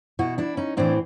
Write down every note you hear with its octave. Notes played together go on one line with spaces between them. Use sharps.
B2 E4 F#4
D4 E4
C#4 D#4
A2 E3 C4 D4